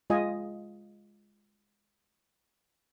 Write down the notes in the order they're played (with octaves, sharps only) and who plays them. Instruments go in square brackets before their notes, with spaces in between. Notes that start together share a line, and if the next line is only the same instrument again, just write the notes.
[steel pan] G#3 F4 D#5 G#5